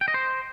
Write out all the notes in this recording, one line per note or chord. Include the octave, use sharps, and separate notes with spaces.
G5
D#5
C5